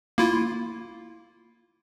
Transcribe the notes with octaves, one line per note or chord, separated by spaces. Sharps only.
A#3 E4 F4